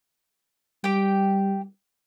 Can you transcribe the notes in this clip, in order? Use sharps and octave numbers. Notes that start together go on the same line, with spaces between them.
G3 G4 G5